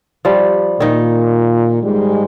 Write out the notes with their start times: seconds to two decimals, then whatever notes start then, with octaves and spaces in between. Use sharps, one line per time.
0.25 F3 G3
0.80 A#2 D#3 D#4
1.83 G#2 G3 G#3